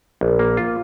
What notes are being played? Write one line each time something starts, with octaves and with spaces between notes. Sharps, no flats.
A#1
A#3
F4